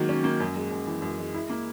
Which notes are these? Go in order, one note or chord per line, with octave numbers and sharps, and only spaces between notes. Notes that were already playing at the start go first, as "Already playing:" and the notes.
Already playing: D#3 F#3 G#3 A#3
C#4
A#3
F#2
G#3
F#2
E3
F#2
G#3
E4
A#3